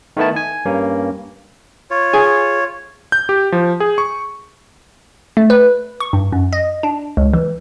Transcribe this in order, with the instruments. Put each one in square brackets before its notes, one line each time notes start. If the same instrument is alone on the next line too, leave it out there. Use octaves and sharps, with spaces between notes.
[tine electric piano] D#3 A3 B3 E4 A5
G#5
G2 A#3 C#4
[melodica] F4 C#5
[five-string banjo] G#4
[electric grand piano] G6
G4
F3
G#4
C#6
[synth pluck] A3
B4
C#6
G2
F#2
D#5
D4
C#2
E3